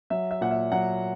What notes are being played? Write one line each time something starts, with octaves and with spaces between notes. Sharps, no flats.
F#3 E5
E5
A#2 F#5
E5
F#3 F#5